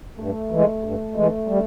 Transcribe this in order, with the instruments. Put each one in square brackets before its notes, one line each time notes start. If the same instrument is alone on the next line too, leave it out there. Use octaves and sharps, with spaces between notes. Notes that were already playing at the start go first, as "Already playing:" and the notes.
[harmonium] G2 [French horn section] A3
[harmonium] E3 G#3
G2
E3 G#3
G3